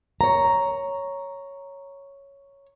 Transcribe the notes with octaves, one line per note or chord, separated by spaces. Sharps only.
C#5 A#5